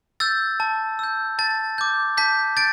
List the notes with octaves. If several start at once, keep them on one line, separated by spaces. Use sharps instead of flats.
E6 G6 A6
A5
E6 G6
A5 A6
D6 G6
A5 G6 B6
G6 A6 D7